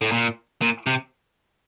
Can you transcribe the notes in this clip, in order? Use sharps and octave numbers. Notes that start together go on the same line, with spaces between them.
A2
A#2
A#2
C3